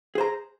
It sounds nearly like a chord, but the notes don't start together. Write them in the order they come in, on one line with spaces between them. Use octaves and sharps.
G#4 C5 A#5